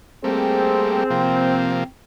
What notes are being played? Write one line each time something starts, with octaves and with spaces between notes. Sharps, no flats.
G3 A3 A#3 C4 G#4
C3 F3 A#3